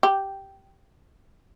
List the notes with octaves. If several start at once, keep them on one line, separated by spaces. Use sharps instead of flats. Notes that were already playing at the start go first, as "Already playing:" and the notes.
G4